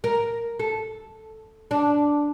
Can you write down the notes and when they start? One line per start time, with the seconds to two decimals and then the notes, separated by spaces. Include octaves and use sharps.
0.04 A#4
0.59 A4
1.71 D4